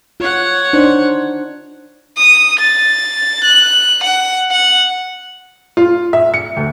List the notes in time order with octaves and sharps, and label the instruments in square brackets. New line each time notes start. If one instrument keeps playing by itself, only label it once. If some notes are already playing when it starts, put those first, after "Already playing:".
[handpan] F4 [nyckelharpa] C#5 F#5
[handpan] D4 D#4 C5
[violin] D#6
A6
F#6
F#5
F#5
[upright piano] F4
E5
C#7
D2